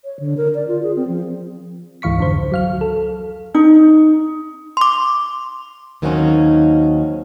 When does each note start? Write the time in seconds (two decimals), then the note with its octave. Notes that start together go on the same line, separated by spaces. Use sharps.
0.05 C#5
0.20 D3
0.37 A#4
0.55 D5
0.68 F4
0.83 G#4
0.96 C4
1.08 F3
2.02 C#2 G#2 E3 F5 C#6 B6
2.18 F2 D3 C5
2.34 C#2
2.52 F#3 F5 F6
2.81 A4
3.54 D#4
4.77 C6 D6
6.02 D#2 D#3 F#3 A#3 C4 C#4